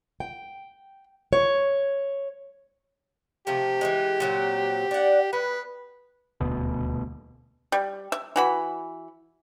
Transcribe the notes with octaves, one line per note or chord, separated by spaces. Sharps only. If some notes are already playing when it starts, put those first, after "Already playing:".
G5
C#5
C3 F3 A3 G4
E3 F#3 G#3
A#2 F#3 C4
D4 F#5
B3 B4
D#1 D2 B2
G3
E5
E3 F#4 B5